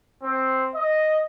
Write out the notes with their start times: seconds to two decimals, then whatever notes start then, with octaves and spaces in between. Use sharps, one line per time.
0.22 C4
0.74 D#5